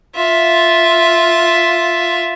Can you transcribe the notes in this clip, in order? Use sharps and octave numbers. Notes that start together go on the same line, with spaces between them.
F4 E5